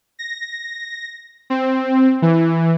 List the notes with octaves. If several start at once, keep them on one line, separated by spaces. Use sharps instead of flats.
A#6
C4
E3